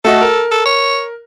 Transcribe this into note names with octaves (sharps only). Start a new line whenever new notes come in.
A3 F#4 A4 D#5
A#4
A4
C#5